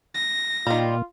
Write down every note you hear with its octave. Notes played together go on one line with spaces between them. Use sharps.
A#6
A#2 D#3 G3 F4